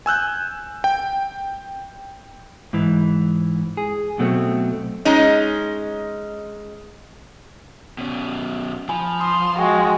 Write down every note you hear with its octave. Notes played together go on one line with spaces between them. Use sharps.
G#5 E6 F#6 G6
G5
G#2 E3
G#4
B2 F#3 A3 C4
G#3 C#4 D#4
B2 C#4
F3 G#5 B5
C6 D#6
G#3 F#4 G5 C#6